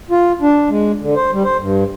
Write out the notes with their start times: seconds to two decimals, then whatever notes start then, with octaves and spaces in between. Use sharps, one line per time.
0.11 F4
0.41 D4
0.69 G#3
1.02 D3
1.16 C5
1.32 G3
1.44 C5
1.60 G2